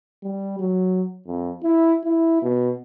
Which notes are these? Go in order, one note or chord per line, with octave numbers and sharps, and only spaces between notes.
G3
F#3
F2
E4
E4
B2